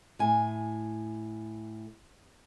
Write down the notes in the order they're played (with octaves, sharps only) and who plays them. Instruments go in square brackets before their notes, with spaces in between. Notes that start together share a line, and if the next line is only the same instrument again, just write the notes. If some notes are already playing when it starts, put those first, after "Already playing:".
[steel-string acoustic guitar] A2 G#5